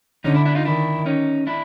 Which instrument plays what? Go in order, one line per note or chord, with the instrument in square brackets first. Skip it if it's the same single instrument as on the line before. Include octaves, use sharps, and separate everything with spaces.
[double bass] D3 [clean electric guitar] C#4 D#4
[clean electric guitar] D4 E4
D4 E4
D#4 F4
[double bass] D#3 [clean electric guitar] D4 E4
[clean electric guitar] C#4 D#4
D4 E4